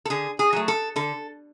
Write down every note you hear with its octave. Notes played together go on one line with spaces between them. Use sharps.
A4
D3 G#4
G#4
F#3 A3
A4
D3 A4